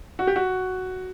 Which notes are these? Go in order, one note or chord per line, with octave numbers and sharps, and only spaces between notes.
F#4
G4
F#4